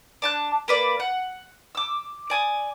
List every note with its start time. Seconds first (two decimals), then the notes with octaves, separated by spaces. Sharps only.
0.22 D4 A5 F#6
0.68 A#3 B4 D5
1.00 F#5
1.75 D6 E6
2.30 D5 G#5 D#6